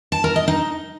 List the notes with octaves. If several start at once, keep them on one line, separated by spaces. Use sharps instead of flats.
A5
A#4
D#5
D#4